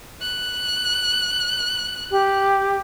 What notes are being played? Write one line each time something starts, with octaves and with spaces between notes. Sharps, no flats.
F#6
G4